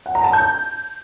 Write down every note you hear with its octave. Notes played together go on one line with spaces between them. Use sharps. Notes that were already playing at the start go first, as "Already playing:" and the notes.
F#5
A#5
A5
G6